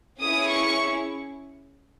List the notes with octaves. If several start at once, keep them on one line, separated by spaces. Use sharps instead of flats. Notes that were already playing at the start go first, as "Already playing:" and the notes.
C#4 E4 G#4 D#6
C#6